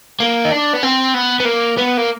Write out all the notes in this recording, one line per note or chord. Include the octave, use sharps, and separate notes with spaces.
A#3
D#4
D4
B3
C4
B3
B3
A#3
B3
A#3